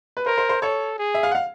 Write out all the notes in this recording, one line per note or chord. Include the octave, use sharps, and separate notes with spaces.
B4
A#4 C5
C5
C5
A4 C#5
G#4
E5
F5
F#5
F5